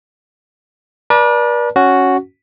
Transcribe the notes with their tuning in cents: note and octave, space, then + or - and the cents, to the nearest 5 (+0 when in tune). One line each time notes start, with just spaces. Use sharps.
B4 -45 D5 +0 A5 +0
C#4 +0 F#4 +0